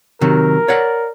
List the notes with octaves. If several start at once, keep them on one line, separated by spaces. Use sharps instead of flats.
C3 D#3 F#3 A#4
C#5 D5 F#5